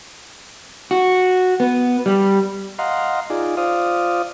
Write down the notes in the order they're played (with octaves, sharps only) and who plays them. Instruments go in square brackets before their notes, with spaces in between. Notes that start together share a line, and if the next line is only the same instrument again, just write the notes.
[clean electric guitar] F#4
B3
G3
[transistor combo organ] D#5 F5 F#5 A#5 C6
D#4 F4 G#4 D5
F4 C5 D5 F5 D#6